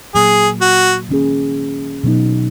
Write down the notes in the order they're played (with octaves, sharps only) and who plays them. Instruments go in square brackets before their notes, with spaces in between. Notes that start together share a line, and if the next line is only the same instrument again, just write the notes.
[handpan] A#2 F#3 A#3 [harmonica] G#4
[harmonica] F#4
[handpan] D#3 A#3 C#4 G#4
B2 F#3 B3 D#4